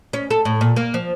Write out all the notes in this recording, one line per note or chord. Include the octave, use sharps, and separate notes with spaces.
C#4
A4
A2
A#2
A#3
F3